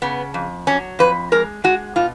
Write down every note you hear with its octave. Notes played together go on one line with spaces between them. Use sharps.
C#3 B3
F2
F#3 C#4
F2 B4
G#3 A#4
G#3 F#4
B2 F4